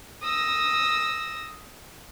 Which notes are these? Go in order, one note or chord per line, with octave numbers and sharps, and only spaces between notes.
D#6 E6 A#6